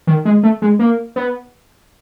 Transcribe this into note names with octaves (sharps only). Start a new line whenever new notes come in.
D#3
G#3
A3
G#3
A#3
B3